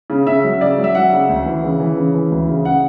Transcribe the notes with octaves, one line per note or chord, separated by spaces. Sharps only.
C#3
C#3 E5
F#3
C#3 D5
F#3
E5
F#3 F#5
C#3
D2
E3
C#3
E3
C#3
E3
D2
C#3
C#3 F#5